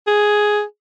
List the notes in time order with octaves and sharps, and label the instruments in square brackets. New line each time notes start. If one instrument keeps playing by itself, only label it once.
[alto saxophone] G#4